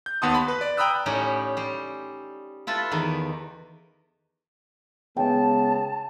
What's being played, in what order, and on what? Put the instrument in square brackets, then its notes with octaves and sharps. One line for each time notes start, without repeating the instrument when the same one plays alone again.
[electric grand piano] G6
D#2 B3 F#5 A5 C6 D#6
B5
B4
D5
G5 A#5 B5 D#6 E6 F#6
[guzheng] A2 G3 C#4 D#4 G4 F#5
G3 C5
E4 F4 A4 B4
E2 D#3
[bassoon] C#3 [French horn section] G#3 B3 [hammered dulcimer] G5 [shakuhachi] A5